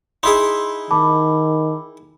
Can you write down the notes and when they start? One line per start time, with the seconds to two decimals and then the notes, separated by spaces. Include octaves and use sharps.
0.23 D#4 E4 G#4 C6
0.91 D#3 A5 B5 D6